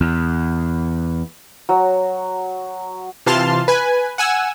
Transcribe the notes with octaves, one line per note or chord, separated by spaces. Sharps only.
E2
F#3
C3 E3 F4 A5 C6 F6
B4 G#5
F#5 G#5 E6